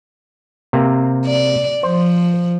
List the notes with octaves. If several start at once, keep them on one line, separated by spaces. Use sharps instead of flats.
C3 A#3 C4
D5
F3 C5